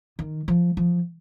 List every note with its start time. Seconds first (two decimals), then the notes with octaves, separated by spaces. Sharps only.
0.19 D#3
0.48 F3
0.77 F3